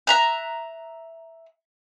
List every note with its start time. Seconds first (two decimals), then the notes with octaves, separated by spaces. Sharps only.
0.07 E5 A#5 F#6